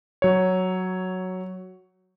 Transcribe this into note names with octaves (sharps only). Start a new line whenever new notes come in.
F#3 C#5